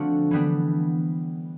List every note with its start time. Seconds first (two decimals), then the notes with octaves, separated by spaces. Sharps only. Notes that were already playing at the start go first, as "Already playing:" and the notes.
Already playing: D3 F3 A3 C4 D4 F#4
0.31 E3 G3 B3 D4